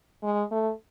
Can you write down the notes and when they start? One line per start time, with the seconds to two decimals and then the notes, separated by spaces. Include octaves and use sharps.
0.23 G#3
0.51 A3